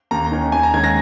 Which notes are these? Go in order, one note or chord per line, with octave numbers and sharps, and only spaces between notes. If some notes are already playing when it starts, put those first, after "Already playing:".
D#2 A#5
D#3 C#4
D#2 G#5
A#5
D#3 G#3 C#4 G#6
A#6